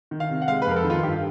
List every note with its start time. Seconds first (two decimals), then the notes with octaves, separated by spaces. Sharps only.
0.11 D#3
0.20 F5
0.30 C3
0.42 F#5
0.48 G#3 F5
0.62 B4
0.67 F2 A#4
0.76 A4
0.84 D#3
0.90 F4
1.03 G2 G4